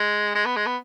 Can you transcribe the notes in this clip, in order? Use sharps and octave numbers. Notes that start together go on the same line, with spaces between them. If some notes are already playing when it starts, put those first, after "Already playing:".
Already playing: G#3
G#3
B3
G#3
B3